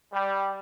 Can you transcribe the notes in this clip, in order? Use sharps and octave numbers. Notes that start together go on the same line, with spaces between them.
G3